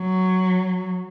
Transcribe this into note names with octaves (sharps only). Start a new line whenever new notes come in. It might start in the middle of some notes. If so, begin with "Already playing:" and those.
Already playing: F#3